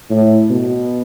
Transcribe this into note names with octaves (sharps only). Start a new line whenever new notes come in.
A2
B2